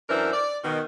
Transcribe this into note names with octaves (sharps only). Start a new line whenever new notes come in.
F#2 E3 D4 A#4 C5 E5
D5
B2 D#3